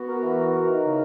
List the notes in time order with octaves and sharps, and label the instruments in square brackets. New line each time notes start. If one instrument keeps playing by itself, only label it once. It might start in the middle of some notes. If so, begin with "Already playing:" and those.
Already playing: [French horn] B3 [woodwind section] F#4
[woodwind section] A#4
E3
F#4
A#4
[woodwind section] E3 [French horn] D#4
[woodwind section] C#3